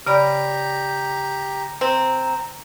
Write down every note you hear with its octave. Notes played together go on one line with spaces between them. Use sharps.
C#3 G4 D5 A#5 B5
C4 A#5